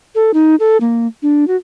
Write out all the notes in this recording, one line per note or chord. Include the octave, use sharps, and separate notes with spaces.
A4
D#4
A4
A#3
D4
F#4